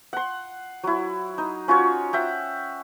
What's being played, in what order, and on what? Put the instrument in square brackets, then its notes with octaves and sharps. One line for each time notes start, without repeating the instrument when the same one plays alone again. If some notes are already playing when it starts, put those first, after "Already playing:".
[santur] F#5 C6
F#3 E4
D#4
C#4 F4 F#4 C#5
E5 F#5 G5